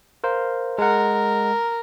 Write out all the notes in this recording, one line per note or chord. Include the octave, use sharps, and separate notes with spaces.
A#4 C5 F5
G#3 A#4 F#5